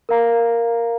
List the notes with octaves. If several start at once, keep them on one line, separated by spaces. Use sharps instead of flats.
A#4 F5 A#5